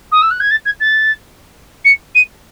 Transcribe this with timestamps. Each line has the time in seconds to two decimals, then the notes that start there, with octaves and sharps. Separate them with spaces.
0.11 D#6
0.21 E6
0.30 F#6
0.40 G#6
0.50 A6
0.65 G#6
0.80 A6
1.84 C#7
2.14 D#7